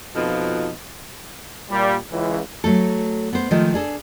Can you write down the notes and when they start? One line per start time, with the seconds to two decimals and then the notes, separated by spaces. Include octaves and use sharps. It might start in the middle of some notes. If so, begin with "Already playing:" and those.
0.16 F2 B2 F3 D#4
1.71 A#2 G3
2.11 C#2 E3
2.64 F#3 A3 A4
3.33 B3 C5
3.51 D#3 F3 G#3 A3 D#4
3.74 D4 G#4 A4